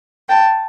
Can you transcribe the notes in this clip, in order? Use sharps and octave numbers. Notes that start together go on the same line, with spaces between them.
G5 A5